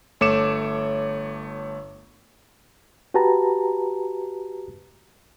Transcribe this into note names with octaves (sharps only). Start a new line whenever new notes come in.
G1 A3 C#5 D6 C#7 E7
F#4 G4 B4 A5 A#5